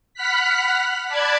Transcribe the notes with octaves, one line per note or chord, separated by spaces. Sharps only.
F#5 B5 F6 F#6 B6
D5 A5 B5 F#6 G#6